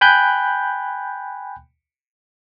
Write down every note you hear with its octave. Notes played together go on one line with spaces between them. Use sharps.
G5 G#5 B5 F#6 G6